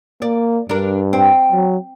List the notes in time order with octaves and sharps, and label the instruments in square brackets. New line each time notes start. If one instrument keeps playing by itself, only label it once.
[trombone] A#3 [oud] D5
[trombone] G2 [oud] D4 A#4
[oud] C4
[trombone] F#3